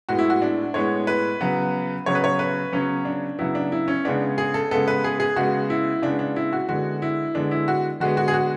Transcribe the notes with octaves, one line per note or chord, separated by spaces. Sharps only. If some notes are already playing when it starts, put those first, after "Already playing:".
A2 G#3 B3 F#4
E4
F#4
D4
A2 G#3 B3 C#5
B4
C#3 F#3 B3
C#3 F#3 B3 C#5
B4
C#5
B4
C#3 F#3 B3 C#4
D4
C#3 F#3 B3 E4
D4
E4
C#4
C#3 G#3 B3 D4
G#4
A4
C#3 G#3 B3 A4
B4
G#4
G#4
C#3 G#3 B3 F#4
E4
C#3 G#3 B3 D4
D4
E4
F#4
D3 G#3 B3 F#4
E4
D3 G#3 B3 D4
E4
F#4
D3 G#3 B3 F#4
F#4
G#4
F#4